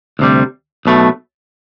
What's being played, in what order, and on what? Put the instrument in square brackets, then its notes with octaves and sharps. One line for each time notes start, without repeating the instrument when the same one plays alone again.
[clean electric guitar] D2 C3 G3
B1 B2 A3